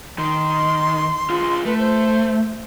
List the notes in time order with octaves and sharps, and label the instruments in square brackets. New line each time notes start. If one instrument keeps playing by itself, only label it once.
[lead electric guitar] D#3 [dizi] C6
[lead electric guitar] F4 G#4
[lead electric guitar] A3 [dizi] B4
[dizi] C5